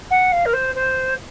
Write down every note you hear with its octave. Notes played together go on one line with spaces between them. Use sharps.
F#5
F5
A#4
C5
C5